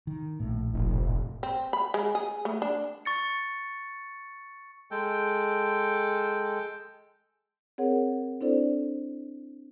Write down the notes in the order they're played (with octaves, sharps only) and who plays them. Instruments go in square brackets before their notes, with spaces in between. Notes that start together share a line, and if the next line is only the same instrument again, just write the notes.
[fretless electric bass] D#3
A#1 A2
[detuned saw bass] F1
[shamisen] C4
B5
G#3
G#4
A3
D4
[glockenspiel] C#6 A6 C#7
[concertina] G#3 A4 G5
[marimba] C4 G#4 A#4 C#5 F#5
C4 D4 E4 A4 C5 D5